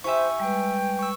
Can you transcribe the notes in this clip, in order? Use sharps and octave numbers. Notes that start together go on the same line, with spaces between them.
E4 G4 C5 E5 G#5 C#6
G3 G#3 B4 G5
C#6 E6